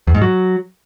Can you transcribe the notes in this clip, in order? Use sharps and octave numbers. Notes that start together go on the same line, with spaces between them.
E2
G#2
F#3